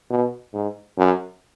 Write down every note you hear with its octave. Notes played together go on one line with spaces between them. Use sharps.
B2
G#2
F#2